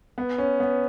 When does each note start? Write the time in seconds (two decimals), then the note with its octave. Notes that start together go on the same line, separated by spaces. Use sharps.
0.18 B3
0.38 C#4
0.60 B3